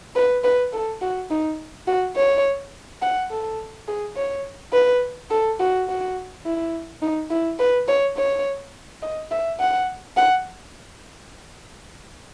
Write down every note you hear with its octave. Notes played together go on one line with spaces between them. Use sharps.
B4
B4
A4
F#4
D#4
F#4
C#5
F#5
A4
G#4
C#5
B4
A4
F#4
F#4
E4
D#4
E4
B4
C#5
C#5
D#5
E5
F#5
F#5